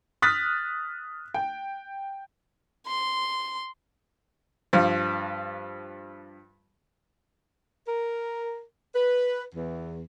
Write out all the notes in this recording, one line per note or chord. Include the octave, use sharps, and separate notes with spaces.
D#6 F6 F#6 A6 B6
G5
C6
G2 F3
A#4
B4
E2